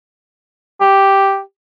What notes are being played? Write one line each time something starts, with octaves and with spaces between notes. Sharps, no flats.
G4